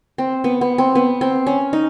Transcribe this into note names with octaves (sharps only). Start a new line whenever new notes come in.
C4
B3
B3
C4
B3
C4
C#4
D#4